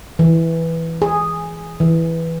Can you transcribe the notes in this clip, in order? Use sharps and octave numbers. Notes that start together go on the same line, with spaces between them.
E3
G#4
E3